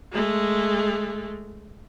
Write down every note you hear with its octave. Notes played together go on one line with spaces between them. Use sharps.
G#3 A3